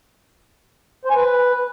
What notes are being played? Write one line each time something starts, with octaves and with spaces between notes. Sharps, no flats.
C5
G#5
B4